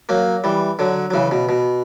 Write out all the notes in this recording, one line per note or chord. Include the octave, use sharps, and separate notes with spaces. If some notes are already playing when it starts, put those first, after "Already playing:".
F#3 A#3
E3 G3
D3 F#3
F#3
C#3 E3
B2
B2